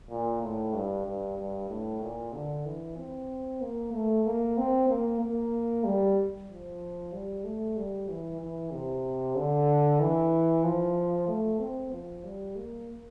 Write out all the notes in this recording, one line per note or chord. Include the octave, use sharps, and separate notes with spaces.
A#2
A2
G2
G2
G2
A2
A#2
D3
E3
C4
A#3
A3
A#3
C4
A#3
A#3
G3
F3
G3
A3
G3
E3
E3
C3
D3
E3
F3
A3
C4
F3
G3
A#3